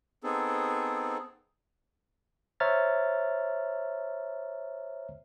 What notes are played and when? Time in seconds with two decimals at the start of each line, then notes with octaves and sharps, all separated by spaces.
0.24 B3 C4 D#4 G#4 A4
2.60 C5 C#5 E5 A#5 F6 A6